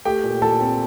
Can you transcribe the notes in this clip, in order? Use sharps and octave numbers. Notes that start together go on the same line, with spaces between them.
A3 G4 G5
A#2
A#2 A4 A5
C4